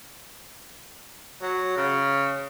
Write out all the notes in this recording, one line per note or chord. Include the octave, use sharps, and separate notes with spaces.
F#3
C#3